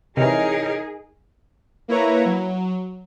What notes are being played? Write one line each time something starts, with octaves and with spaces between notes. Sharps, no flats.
C3 E3 D#4 E4 G#4 A#4 C#5 D#5
A#3 E4 B4 C#5 A#5
F#3